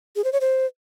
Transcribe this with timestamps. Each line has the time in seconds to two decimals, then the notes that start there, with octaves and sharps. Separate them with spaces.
0.16 G#4
0.24 C5
0.33 C#5
0.41 C5